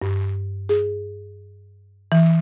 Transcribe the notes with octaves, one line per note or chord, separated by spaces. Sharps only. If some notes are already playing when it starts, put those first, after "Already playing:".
G2
G#4
E3